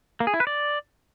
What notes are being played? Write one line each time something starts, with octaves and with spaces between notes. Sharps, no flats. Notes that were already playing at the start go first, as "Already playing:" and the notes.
A#3
G#4
E4
B4
D5